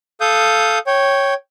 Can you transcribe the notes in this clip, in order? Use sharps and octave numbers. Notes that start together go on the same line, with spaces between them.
A4 F5 D#6 G6
C#5 G5